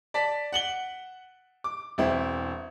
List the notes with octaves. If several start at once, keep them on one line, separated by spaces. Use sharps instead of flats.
D5 A5 B6
F#5 F#7 G7
D6
E1 C4 E4